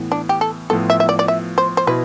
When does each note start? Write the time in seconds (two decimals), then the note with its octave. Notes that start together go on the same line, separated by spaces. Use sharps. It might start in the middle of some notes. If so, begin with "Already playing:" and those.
Already playing: A2 E3 B3
0.12 D4
0.29 G4
0.41 A4
0.70 A2 F3 B3 F4 A4
0.90 E5
1.00 E5
1.09 D5
1.19 D5
1.28 E5
1.58 C5
1.77 C5
1.87 B2 B3 E4 B4